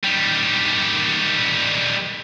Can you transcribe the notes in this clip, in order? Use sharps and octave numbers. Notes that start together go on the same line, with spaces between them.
D#3 G3